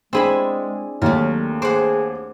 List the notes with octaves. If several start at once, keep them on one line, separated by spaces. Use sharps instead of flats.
G#3 C4 D4 E4 G#4 G#5 B5
D#2 F#3 A3 A#4
G#4 C5 F#5 D6